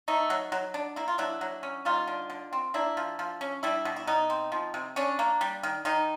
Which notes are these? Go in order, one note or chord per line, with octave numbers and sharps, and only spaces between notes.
A3 D#4
F#3
F#3
D4
A#3 E4
F4
F#3 D4 E4
F#3
C#4
G3 D#4 F4
D3
D3
C4
A#3 D4 E4
F3
F3
C#4
G3 D4 E4
B2
E4
B2 D#4
C4
F3
C3
C#4 D4
A#3
G3
D#3
D#3 D#4